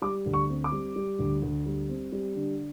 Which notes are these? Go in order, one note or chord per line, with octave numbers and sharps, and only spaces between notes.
G3 D6
D2
C#6
C4
D6
G3
G3
D2
D2
G3
C4
G3
D3